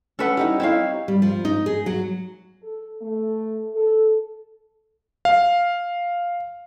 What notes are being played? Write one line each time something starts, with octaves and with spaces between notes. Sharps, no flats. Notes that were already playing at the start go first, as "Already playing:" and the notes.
C#4 A4 B4 F#5 C#6
G3 D#4 E4
C4 D#4 E4 C#5 F5
G3
F3
D#4
G#4
F#3
A4
A3
A4
F5